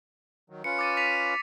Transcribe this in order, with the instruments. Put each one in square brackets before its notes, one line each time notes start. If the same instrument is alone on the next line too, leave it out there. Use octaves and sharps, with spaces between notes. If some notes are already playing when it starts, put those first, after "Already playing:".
[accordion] D#3 F#3
[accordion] C#4 F4 B4 [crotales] C#7
[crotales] D6 A6 D#7
B6 D#7 F7